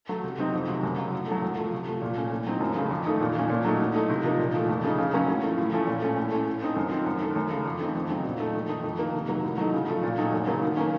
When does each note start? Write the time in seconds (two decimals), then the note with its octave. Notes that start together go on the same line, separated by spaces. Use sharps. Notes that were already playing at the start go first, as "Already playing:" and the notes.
0.09 F#3 A3
0.24 C3
0.39 F#3 C4 D#4
0.53 F2
0.68 C3 F#3
0.83 F#2
0.98 C#3 F#3
1.13 A2
1.27 F#3 A3
1.42 F#2
1.57 F3 A3
1.72 C3
1.87 F3 A3
2.02 A#2
2.16 A3 C#4
2.31 A2
2.46 F#3 C4 D#4
2.61 F#2
2.76 C#3 A3 C#4
2.91 F2
3.05 D#3 A3 D#4
3.20 A#2
3.35 F3 A3 C#4
3.50 A#2
3.65 F#3 A3 D#4
3.80 A2
3.95 A3 D#4
4.09 C3
4.24 F3 A#3 D#4
4.39 A#2
4.54 F3 A3
4.69 F2
4.84 C#3 A3 D#4
4.98 C#3
5.13 F#3 A#3 C#4
5.28 A2
5.43 F3 A3
5.58 A2
5.72 F3 A3 C#4
5.87 A#2
6.02 A3 C#4
6.17 A2
6.32 A3 C#4
6.47 A2
6.62 A3 C4 D#4
6.76 F#2
6.91 F3 C4 D#4
7.06 F#2
7.21 D#3 A3
7.36 F#2
7.51 C#3 A3
7.65 F2
7.80 D#3 A3 C4 D#4
7.95 F2
8.10 C#3 F#3 C4 D#4
8.25 A#2
8.40 A3 D#4
8.55 F2
8.69 D#3 A3 D#4
8.84 F2
8.99 D#3 A#3
9.14 C3
9.29 D#3 F#3 A#3
9.43 A2
9.58 F#3 A3 D#4
9.73 C#3
9.88 F3 A3
10.03 A#2
10.18 F#3 A3 D#4
10.33 F#2
10.47 C#3 F#3 A#3
10.62 D#3
10.77 A#3 C#4